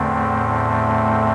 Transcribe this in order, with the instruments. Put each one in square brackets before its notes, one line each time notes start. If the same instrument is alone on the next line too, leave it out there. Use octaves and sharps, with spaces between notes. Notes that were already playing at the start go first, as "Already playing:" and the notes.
Already playing: [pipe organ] E2 D3 A3 C4 [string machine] A2
[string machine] A2